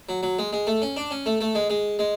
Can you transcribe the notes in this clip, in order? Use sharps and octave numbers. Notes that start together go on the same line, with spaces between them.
F#3
F#3
G#3
G#3
A3
C#4
D4
C#4
A3
A3
G#3
G#3
G#3